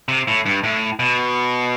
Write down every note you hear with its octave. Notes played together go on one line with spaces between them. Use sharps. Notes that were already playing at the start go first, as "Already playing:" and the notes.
C3
A2
G2
A2
B2